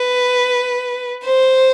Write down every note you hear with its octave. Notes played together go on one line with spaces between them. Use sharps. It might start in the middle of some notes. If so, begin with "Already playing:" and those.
Already playing: B4
C5